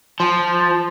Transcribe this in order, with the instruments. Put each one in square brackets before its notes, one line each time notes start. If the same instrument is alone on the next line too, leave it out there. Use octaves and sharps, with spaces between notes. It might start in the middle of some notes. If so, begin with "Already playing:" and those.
[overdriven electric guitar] F3